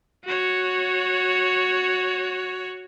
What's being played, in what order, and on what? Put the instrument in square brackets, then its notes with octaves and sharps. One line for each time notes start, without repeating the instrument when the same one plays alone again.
[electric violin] F#4 C#5